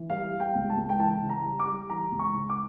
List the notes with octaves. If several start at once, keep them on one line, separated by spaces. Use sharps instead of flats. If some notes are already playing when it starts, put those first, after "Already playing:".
Already playing: E3
G3 F5
G3
G5
C#2
A5
C#2
G5
E3 A5
C#3
A#5
G3
D6
G3
E3 A#5
C#2
C#6
C#3
D6